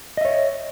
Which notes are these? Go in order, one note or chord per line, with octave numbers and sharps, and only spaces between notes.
C#5 D#5 E5